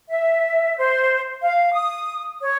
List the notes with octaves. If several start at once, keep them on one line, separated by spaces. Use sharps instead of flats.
E5
C5
F5
D#6
C#5